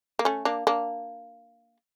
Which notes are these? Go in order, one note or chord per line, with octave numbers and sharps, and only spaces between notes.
A#3
A3 C#4
A#3 D4
A#3 D4